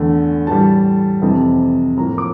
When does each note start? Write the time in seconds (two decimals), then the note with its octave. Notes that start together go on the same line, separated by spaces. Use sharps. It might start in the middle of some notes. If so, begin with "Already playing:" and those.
Already playing: E2 D3 A3
0.47 A2 E3 G3 A5
1.22 F2 C3 E3
1.97 A2 F3 A#3 A#5
2.18 D6